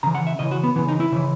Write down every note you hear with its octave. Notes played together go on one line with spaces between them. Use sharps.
C#3 E3 A#5
F#5
E5
C#3 E3 D#5
F#4
B3
C#3 E3 B3
D#4
E4
C#3 E3